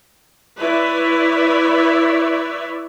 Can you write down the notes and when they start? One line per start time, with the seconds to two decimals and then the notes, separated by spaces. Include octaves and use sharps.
0.59 E4 B4 C#5 D5 E5